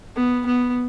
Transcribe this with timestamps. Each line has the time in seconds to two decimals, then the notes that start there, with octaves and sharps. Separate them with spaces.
0.16 B3
0.46 B3